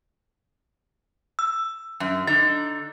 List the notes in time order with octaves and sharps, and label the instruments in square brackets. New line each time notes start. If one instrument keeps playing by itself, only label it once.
[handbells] E6
[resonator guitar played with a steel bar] F#2
[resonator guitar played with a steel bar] D3 D#4 [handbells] A6